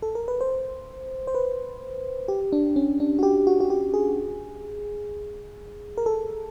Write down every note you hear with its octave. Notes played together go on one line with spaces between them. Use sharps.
A4
A#4
B4
C5
C5
B4
G4
D4
C#4
D4
F#4
G4
F#4
F#4
G4
G#4
A#4
A4